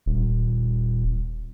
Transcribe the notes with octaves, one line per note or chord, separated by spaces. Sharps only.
D#1